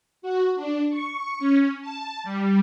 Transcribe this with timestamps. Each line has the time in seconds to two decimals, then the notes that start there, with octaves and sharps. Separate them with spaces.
0.22 F#4
0.56 D4
0.90 C#6
1.39 C#4
1.82 A5
2.24 G3